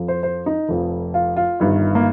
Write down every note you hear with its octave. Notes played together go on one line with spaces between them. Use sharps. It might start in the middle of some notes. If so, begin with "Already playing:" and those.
Already playing: F2 F3
C5
C5
D#4
F1 F2 F3
F4
F4
G1 G2 D#3
A#3